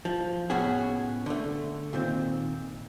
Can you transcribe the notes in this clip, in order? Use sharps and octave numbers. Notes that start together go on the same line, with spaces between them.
F3
A2 C#3 B3 C#4 F#4 G#4
D3 A3
A#2 D#3 C4